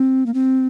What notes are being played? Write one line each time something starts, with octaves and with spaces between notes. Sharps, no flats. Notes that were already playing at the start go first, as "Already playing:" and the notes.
Already playing: C4
A#3
C4